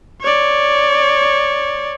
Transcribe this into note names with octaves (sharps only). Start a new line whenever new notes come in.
C#5 D5